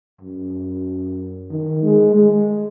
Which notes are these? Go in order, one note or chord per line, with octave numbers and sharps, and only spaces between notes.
F#2
D#3
G#3
G#3